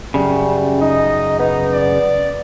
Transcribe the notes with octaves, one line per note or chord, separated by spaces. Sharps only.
F#2 C#3 G3
D#4 D#5
B3 D#4
D5